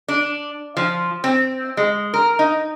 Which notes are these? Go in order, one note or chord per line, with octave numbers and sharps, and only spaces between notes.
D4
F3
C4
G#3
A#4
D#4